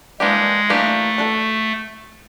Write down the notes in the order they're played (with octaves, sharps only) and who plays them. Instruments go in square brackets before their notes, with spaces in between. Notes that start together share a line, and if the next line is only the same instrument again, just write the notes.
[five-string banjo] E3 G3 A#3 D4 G4 [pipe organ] G#3
[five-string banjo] E3 G3 A#3 D4 G4 [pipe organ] A3
[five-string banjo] D4 F#4 A4